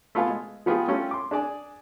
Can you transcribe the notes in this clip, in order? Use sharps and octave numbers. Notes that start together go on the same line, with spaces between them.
A3 B3 F4 F5 G#5
G#3
F3 B3 F4 G4 G#4
G3 A3 C#4 F4 G4
C6 D6
D4 G#4 D5 G#5